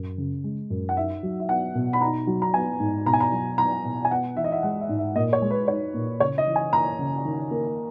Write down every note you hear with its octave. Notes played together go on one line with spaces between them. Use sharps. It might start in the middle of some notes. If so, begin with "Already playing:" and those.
Already playing: F#2
C#3
G#3
F#2
F#5
D#4 E5
F#3
E5
B3 F#5
B2
B5
D#4 A#5
F#3
A#5
B3 G#5
G#2
B2 A#5
G#5
A#5
F#3
B3 A#5
B2
G#5
B3 F#5
E3 E5
D#5
E5
G#3 F#5
E5
G#2
E5
A#2 D#5
C#5
G#3
B4
D#4 C#5
A#2
C#3 C#5
D#5
E3
G#5
A#3 A#5
C#3
D#3
A#3